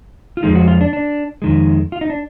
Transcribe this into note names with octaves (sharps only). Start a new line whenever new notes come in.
F4
F2 F3 G#3 D#4
F#4
F4
D4
D4
F2 D#3 G#3
F4
D#4
D4